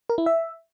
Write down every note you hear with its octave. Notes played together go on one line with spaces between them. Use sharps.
A#4
E4
E5